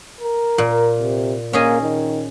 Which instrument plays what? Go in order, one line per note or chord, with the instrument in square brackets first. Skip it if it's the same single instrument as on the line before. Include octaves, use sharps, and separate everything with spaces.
[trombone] A#4
[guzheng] A#2
[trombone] C3
[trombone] A#3 [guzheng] C#4 G#4 D#5
[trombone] D#3